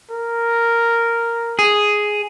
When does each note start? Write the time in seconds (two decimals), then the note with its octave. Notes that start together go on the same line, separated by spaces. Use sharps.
0.11 A#4
1.59 G#4